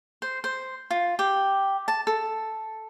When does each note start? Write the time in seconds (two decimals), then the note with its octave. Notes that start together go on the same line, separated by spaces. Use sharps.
0.22 C5
0.44 C5
0.91 F4
1.19 G4
1.88 A5
2.07 A4